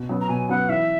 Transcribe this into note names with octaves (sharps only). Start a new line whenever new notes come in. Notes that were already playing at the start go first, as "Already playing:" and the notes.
Already playing: B2
F#3 B3
A#5
B2 G#5
F#3 B3 F#5
E3 E5